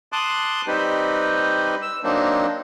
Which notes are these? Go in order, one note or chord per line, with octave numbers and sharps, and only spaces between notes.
A5 C6 D6 D#6 F#6
G3 C4 D#4 G4 B4
E6
F#3 A#3 C4 D4 D#4